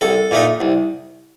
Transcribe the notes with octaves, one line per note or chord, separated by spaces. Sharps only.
C2 A4
A#2 A3 D#4
C2